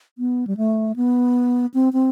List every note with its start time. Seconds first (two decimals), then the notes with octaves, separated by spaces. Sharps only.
0.18 B3
0.47 G3
0.57 A3
0.96 B3
1.74 C4
1.93 C4